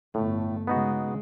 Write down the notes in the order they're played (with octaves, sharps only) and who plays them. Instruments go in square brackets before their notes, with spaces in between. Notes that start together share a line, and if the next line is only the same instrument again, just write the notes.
[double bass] G1 A3 [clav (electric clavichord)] A2
[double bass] C#3 G#3 [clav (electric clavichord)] B3 D#4 F#4